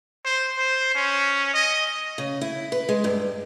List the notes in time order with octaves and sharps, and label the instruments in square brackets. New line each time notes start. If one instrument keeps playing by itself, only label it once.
[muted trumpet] C5
C5
C#4
D#5
[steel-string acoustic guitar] C#3
E4
B4
G#3
G2